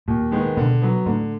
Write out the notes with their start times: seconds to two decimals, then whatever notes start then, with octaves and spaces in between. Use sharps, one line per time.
0.08 D#2 A#2
0.32 D#3 G#3 B3
0.57 B2 D3
0.82 F#3 B3
1.06 A2 D3